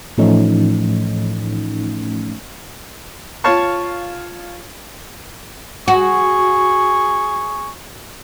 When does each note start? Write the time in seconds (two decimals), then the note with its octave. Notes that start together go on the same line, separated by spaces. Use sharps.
0.18 A2 E3 F3 A3 C#4 D#4
3.44 F4 C#5 F5 A5 C#6
5.88 F#4 G#4 C#6